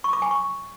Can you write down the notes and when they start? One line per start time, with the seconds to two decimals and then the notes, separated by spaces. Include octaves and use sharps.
0.04 C#6
0.13 D6
0.22 G#5
0.31 C#6